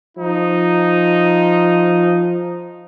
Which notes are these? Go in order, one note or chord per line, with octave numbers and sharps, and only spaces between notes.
F3 D#4